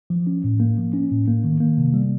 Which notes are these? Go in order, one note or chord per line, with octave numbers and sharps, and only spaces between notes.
F3
C#4
A2
A#3
F3
C#4
A2
A#3
D#3
A#3
C3
G3